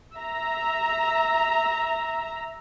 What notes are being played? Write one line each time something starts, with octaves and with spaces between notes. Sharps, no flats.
E5 A#5